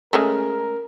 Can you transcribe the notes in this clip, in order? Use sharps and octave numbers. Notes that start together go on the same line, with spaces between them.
C#3 G#3 A3 A#4